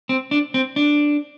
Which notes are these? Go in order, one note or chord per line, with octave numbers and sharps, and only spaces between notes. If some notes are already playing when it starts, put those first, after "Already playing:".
C4
D4
C4
D4